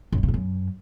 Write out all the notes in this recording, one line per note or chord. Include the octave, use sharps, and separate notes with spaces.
F#2
E3
C#3
G#2
F#2